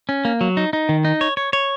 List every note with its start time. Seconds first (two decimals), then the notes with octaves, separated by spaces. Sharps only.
0.09 C#4
0.25 A#3
0.41 F#3
0.57 D#4
0.73 D#4
0.89 D#3
1.05 D#4
1.21 C#5
1.37 C#5
1.53 C#5